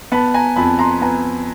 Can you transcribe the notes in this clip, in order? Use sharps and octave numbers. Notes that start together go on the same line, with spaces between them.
B3 A5 B5
G#5 A#5
F2 A5 B5
A#5 C6
B3 G#5 A#5